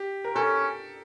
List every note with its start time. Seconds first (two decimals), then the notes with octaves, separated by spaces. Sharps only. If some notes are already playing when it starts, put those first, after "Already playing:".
Already playing: G4
0.24 A#4
0.35 C#4 A4